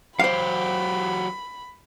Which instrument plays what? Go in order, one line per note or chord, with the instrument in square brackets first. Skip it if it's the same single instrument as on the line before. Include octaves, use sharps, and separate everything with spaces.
[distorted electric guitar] F#3 G4 [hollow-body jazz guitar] C5 F5 [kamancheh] B5